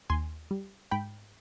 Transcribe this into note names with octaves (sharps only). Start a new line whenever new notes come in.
D#2 G#5 C6
G3
G#2 G5 B5